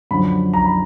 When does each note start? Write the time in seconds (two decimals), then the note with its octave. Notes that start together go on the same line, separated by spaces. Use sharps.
0.11 F#2 D3 F3 B5
0.53 A#5
0.65 B5